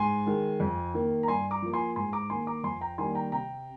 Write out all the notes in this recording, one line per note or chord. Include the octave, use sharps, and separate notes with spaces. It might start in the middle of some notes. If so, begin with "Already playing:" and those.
Already playing: G#2 G#5 C6
D#3 G#3
F2
D#3 A#3
A#5
G2 G#5 C6
A#5 D6
F3 A#3
G#5 C6
G#2 G#5 C6
A#5 D6
D#3 A#3 G#5 C6
A#5 D6
F2 G#5 C6
G5 A#5
D#3 G3 A#3 G#5 C6
G5 A#5
C3 G5 A#5